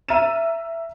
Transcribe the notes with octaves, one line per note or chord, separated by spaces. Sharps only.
E5 A#5 F6 A6 D#7 E7